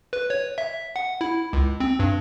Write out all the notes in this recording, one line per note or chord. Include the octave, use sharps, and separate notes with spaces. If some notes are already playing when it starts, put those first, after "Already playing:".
B4
C#5
E5
F#5
E4
C#2
C4
G2